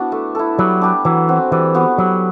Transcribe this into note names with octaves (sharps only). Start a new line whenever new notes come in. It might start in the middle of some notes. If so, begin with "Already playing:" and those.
Already playing: B3 D4 E4 F#4
A3
E4 A4
F#3 G3
D4 G4 B4
E3 F#3
C4 F#4
E3 G3
B3 F#4 B4
F#3 G3